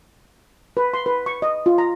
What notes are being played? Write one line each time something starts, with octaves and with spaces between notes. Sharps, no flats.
B4
C6
B4
C#6
D#5
F4
A#5